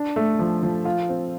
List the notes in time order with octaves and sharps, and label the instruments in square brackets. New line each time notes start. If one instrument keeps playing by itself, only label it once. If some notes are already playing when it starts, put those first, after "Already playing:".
Already playing: [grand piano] D4
A3
F3
F3
F4
C4